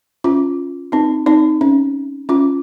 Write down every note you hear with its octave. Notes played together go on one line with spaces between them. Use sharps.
C#4 F4
C4 D#4
C4 D#4
C#4
C#4 F4